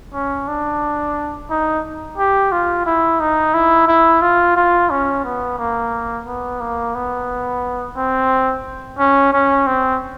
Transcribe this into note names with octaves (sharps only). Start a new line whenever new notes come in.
C#4
D4
D#4
G4
F4
E4
D#4
E4
E4
F4
F4
C#4
B3
A#3
B3
A#3
B3
C4
C#4
C#4
C4